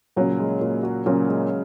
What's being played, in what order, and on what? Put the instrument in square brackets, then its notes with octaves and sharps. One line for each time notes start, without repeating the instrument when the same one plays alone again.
[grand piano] A#2 [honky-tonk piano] C#3 F#3
[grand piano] G#3
A#2
F#4
[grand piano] A#2 [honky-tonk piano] C#3 F#3
[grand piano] G#3